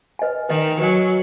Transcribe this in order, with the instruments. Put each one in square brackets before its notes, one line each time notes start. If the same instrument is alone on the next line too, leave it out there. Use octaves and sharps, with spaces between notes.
[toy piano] B4 D#5 G#5
[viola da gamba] D#3 [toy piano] B4 D#5 G#5
[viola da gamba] F#3 [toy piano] B4 D#5 G#5